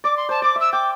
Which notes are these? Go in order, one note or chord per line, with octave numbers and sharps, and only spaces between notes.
D5 D6
C6
C5 A5
D5 D6
E5 E6
G5 D6